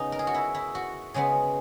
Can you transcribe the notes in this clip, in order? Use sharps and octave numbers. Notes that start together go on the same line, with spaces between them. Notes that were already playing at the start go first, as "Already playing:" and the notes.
Already playing: C#3 B3 C#4 D#4
A#4
G#4
F#4
E4
E4
F#4
C#3 G#3 B3 G#4